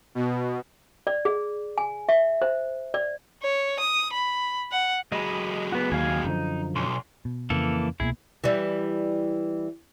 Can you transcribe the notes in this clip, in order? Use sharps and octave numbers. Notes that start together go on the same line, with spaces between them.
B2
D5
G#4
G#5
E5
C5
D5
C#5
D#6
B5
F#5
F#3 G#3 D#5 B5
B3 F#4
D#2 G#4 F5 G#5
F#2 D3 F3 D#4
B1 C6
B2
F2 C#3 E3 A#3 A4
C2 B2 A#3 E4 G#4
E3 G3